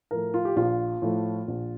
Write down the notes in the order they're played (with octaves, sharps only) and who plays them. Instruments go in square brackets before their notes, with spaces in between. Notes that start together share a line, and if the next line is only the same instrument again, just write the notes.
[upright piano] A2 F3 A3 A#4
F4
G4
A#1 F4
A2 F3 A3
A#1